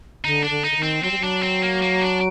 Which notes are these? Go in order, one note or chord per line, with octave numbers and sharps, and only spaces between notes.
D3 D#4
D4
D3
D#4
D3
D#3
C4
F#3 C4
G3
F#3 D4
C4
A#3
A#3
D4